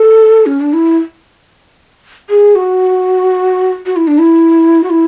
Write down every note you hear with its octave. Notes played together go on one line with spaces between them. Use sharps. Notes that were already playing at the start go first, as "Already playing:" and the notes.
Already playing: A4
C#4
D4
E4
G#4
F#4
F#4
E4
D4
E4
F#4
E4